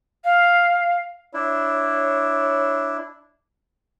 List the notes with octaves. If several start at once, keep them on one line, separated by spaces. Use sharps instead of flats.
F5
D4 E4 C#5